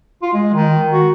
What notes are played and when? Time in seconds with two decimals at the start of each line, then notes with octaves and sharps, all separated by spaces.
0.22 F4
0.34 G#3
0.54 D#3
0.91 F#4